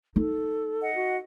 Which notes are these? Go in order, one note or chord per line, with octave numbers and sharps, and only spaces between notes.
D#4 A4
D#5 F#5
F#4